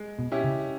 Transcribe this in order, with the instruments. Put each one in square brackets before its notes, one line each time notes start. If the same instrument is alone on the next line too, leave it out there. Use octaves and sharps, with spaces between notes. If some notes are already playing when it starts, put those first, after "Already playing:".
Already playing: [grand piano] G#3
[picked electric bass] B2
[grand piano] C#4 E4 G4
[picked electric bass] C#3